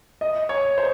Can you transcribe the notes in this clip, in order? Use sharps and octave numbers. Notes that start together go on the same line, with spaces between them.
D#5
C#5
C5